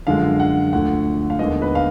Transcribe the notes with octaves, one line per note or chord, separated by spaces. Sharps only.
F#2 D3 F3 G#3 F5
F#5
D2 D3 F3 F#5
F5
D#2 D3 G#3 B3 D#5
B4
F5